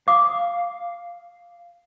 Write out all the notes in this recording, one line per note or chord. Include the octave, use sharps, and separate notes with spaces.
F5 D6 D#6